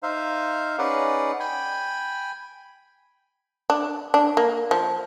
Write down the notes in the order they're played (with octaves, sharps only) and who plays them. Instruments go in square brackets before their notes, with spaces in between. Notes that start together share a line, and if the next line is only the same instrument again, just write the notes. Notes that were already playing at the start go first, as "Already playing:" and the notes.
[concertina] D#4 C5 E5 F5
C#4 D#4 G#4 B4 D5 F#5
G5 G#5 B5
[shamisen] D4
D4
A#3
F3